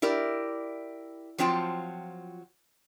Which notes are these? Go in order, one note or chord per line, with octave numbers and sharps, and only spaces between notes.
E4 G4 A#4 D5
F3 F#3 C4 F4 G5 A5